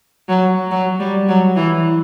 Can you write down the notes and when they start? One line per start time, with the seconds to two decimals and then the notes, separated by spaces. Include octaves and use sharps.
0.29 F#3
0.71 F#3
1.00 G3
1.28 F#3
1.56 E3